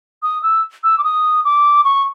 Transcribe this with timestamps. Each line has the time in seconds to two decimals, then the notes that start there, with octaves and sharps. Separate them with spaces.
0.23 D#6
0.43 E6
0.84 E6
0.98 D6
1.04 D#6
1.45 D6
1.84 C#6